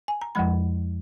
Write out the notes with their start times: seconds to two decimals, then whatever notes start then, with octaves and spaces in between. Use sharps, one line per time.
0.08 G#5
0.21 A#5
0.35 F2 F3 G#3 B5